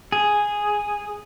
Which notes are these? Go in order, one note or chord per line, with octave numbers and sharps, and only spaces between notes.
G#4